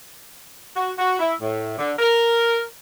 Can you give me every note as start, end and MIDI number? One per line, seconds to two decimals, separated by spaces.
0.75 0.90 66
0.98 1.17 66
1.19 1.34 64
1.41 1.73 45
1.79 1.92 50
1.99 2.61 70